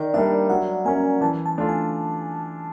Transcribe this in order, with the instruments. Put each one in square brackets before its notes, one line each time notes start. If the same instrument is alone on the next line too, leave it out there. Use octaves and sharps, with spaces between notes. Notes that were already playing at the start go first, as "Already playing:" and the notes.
Already playing: [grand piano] D#3 [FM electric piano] D5
[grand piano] G3 A#3 D4 [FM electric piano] E5
[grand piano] F#3 [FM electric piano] F#5
[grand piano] A#3 C#4 [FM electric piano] G#5
[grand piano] E3 [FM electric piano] A5
[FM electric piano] A5
[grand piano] A3 D4 F4
[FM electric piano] G#5